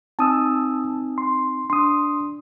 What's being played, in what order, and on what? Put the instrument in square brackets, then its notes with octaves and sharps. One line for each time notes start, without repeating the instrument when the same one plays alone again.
[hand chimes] C4 D#4 G#5 [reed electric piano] A5 D#6 E6
[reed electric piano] C6
[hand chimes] D4 [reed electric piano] C6 D#6